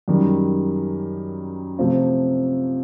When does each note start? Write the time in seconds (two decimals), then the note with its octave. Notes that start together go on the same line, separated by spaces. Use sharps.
0.08 F#2 D#3 G3
1.78 C3 F3 A3 C4 F4